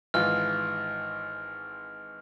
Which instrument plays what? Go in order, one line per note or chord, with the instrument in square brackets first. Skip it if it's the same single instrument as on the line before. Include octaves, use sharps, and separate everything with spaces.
[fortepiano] G#1 E3 F4 [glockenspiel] F6